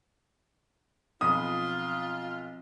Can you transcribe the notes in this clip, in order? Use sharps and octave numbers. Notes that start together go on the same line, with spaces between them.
B1 F3 C4 F4 B5 D#6